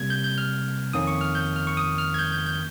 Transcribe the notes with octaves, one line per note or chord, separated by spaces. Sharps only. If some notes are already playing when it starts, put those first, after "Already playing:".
Already playing: C3 G3 A#3 G#6
G6
G6
F6
F2 D#3 A#3 C#4 D#6
C#6
F6
G6
F6
C#6
D#6
F6
G#6
G6
G6
G6